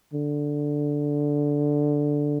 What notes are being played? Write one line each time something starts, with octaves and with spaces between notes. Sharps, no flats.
D3